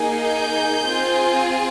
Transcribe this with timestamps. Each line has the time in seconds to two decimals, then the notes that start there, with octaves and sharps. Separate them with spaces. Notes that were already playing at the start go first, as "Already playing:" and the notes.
Already playing: A#3 D#4 G#4
0.24 G6
0.86 C4 F4 G#4